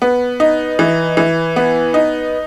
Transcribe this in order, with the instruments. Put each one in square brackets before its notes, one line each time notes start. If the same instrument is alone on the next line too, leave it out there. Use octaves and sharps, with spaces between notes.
[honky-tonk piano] B3
D#4
E3
E3
B3
D#4